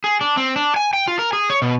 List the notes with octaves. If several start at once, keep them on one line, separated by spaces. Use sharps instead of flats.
G#4
D4
C4
D4
G#5
G5
F4
A#4
G#4
C#5
B2